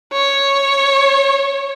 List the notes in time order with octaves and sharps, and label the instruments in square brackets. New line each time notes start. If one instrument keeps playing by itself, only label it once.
[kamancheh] C#5